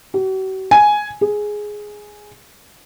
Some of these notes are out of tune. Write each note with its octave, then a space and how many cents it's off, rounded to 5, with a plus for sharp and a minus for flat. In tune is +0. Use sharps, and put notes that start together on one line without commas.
F#4 +45
G#5 +5
G#4 +5